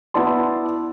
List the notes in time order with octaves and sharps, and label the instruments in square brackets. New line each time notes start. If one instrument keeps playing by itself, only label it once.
[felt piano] B3 E4 D5 A5 C6